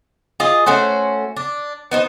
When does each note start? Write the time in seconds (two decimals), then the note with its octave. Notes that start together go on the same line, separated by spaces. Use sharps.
0.40 F4 G#4 D#5
0.66 A3 C#4 F#4 C5
1.36 D4
1.91 B3 D#4 C5